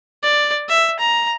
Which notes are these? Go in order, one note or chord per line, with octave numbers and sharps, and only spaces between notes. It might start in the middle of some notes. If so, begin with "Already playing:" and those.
D5
E5
A#5